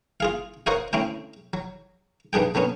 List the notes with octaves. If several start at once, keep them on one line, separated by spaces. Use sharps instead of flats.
F4 G#4 F5
F#4 A#4 C5 C#5 D#5 F5
D2 C4 C#4 E4 G5
F#3
B1 B3 D4 G#4 G5
D3 F#3 B3 C#4